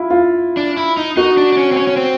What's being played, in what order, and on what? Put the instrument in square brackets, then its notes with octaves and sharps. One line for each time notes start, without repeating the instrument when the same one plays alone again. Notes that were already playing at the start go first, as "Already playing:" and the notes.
Already playing: [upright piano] E4 F4
F4
[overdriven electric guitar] D4
E4
D#4
[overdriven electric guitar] D#4 [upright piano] F#4
[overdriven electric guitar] D4
D4
C#4
C4
C#4
C#4
C4